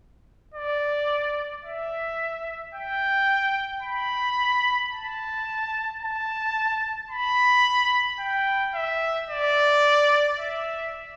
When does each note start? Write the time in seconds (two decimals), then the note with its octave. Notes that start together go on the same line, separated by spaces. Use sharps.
0.54 D5
1.64 E5
2.74 G5
3.82 B5
4.92 A5
6.02 A5
7.10 B5
8.20 G5
8.75 E5
9.29 D5
10.39 E5